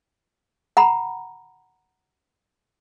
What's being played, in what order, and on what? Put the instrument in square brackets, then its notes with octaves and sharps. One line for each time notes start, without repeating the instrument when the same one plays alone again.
[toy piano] F#5 A#5 B5